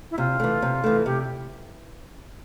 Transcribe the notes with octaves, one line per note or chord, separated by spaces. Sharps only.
E4
C3 F4
E3 A3
C3
E3 A3
C3 G4